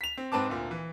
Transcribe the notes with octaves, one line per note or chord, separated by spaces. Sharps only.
B6 F7
C4
G#2 C4 B4 A5 D6
D2 A#2
E3